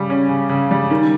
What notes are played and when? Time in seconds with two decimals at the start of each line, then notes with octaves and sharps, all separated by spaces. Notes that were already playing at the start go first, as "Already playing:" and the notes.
Already playing: C#3 G3
0.10 C#4
0.29 C#3
0.49 C#3
0.71 G3
0.91 D#3